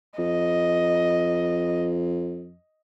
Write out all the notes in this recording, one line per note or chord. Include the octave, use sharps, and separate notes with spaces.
F2 D#5